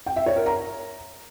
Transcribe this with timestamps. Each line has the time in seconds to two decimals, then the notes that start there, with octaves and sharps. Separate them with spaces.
0.06 G5
0.16 E5
0.26 C#5
0.36 A#4
0.46 A#5